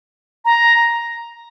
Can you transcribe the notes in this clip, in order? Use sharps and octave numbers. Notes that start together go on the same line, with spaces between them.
A#5